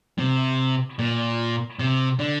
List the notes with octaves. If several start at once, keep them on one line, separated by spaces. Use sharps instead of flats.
C3
A#2
C3
D3